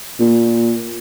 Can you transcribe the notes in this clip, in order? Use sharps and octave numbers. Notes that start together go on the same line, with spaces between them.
A#2